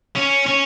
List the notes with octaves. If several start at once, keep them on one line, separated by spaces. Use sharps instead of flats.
C#4
C#4